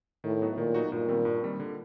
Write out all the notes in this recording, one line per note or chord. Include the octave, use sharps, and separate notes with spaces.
A2 D#3
F#3 B3 D#4 F#4
A#2 D#3
F#3 B3 D#4 F#4
G2 A#2
D#3 G3 C4
G2
D#3 G3 C4
D3